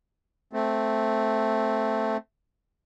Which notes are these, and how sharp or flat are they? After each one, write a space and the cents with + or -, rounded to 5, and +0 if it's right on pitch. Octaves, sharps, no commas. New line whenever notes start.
A3 +0 C4 +0